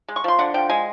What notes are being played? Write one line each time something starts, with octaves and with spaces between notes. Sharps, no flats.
G#3
C#6
F3 C6
D3 F#5
F3 G5
G#3 G#5